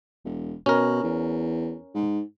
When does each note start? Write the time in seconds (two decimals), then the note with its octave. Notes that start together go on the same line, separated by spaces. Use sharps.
0.25 E1
0.66 B2 C#4 A#4
1.03 E2
1.94 G#2